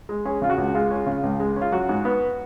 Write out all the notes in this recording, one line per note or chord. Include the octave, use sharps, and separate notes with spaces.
G#3
C#4 G#4
C#3 F4
F#4
C#2
G#3 F4
C#4
C#3
C#2
G#3
C#4
F4
F#3 F#4
G#2
B3